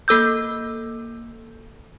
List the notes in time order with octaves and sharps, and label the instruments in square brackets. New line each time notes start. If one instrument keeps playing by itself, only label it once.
[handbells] A#3 A4 E6 G6